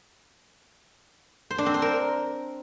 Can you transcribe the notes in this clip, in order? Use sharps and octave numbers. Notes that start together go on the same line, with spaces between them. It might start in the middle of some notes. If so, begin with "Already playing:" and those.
C5
D4
C4
C5
A#4